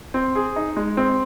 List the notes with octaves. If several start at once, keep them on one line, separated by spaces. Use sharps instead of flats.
C4
G#4
D#4
G#3
C4